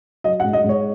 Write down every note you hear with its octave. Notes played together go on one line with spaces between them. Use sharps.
F#3 D#5
F#5
G#2
D#5
G#2 C#5